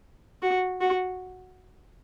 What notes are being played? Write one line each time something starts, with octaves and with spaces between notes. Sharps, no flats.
F#4
F#4